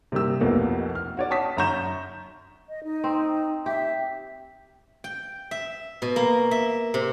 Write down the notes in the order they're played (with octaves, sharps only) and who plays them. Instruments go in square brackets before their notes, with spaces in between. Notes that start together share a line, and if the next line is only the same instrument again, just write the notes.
[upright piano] C3 G3 A#3 G4 E6
B1 F2 B2 A3 A#3
F6
F#4 C#5 D5
A5 C#6 D#6 B6
F#2 C#5 A#5 C#6 G6 E7
[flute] D#5
D#4
[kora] C4
[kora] G4 [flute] E5
[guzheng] G5
E5
B2
A#3
E5
C3